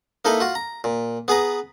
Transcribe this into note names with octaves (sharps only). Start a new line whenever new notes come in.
A#3 D#4 E4 A4 B4
F4 F#4
A#5
A#2
B3 G#4 B4 A#5